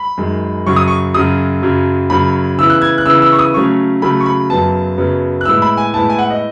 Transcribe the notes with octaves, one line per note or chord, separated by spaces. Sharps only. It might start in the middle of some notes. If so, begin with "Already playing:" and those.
Already playing: B5
F#2 D#3 G#3
F#2 C#3 F#3 C#6
D#6
C#6
F#2 C#3 F#3 D#6
F#2 C#3 F#3
F#2 C#3 F#3 B5
C#3 E3 B3 E4 E6
F#6
G#6
F#6
C#3 E3 B3 E4 E6
E6
C#6
D#6
C#3 F#3 A3 C#4 C#6
C#3 F#3 A3 C#4 B5
C#6
B5
F#2 C#3 F#3 B3 A5
F#2 C#3 F#3 B3
F#6
A2 G#3 B3 E4 E6
B5
G#5
A2 G#3 B3 E4 A5
G#5
F#5
D#5